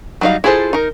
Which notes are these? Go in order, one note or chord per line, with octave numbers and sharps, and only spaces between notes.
F#3 G3 D#4 A#4 F5
E4 F4 G#4 A4 C5
D#4 A#4